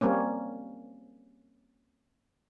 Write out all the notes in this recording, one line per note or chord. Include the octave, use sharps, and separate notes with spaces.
G3 A#3 C4 C#4